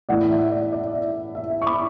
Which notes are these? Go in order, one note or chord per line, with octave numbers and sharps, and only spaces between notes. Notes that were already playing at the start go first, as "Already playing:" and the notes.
A2 E3 A3 E4 D5 F#5
E5
D5
D5
E5
E5
E5
C#6
B5 D6